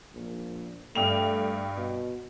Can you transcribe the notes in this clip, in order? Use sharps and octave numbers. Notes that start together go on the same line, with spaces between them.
A#1
G2 A3 G5 F7
B2